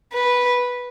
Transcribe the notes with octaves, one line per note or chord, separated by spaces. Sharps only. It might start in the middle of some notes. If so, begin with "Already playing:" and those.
B4